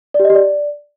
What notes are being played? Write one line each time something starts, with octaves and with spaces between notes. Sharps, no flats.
D5
G4
D#5
G4
D5